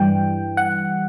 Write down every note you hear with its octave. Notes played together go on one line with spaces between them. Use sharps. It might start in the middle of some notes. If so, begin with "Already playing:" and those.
Already playing: G2 E3 G3 G5
F#5